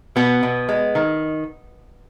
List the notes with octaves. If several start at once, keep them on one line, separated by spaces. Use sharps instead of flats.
B2 B3
B2
G#3
D#3